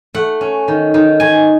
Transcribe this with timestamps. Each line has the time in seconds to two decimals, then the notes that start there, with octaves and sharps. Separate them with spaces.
0.14 A3 F#5
0.41 C#4
0.68 D#3
0.94 D#3
1.20 D#3 G#5